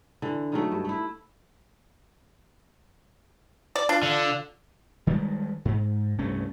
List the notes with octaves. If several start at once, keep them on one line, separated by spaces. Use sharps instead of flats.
D3 E3
D#3 F#3 A3
G2
A3 E4
D5
D4 F4
D3
D#3 G3 G#3
G#2
C2 G2 A3 C#4